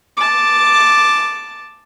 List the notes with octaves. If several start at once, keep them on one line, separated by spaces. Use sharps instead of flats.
A5 D6